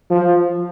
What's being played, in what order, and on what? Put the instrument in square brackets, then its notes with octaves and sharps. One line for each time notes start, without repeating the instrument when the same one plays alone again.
[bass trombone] F3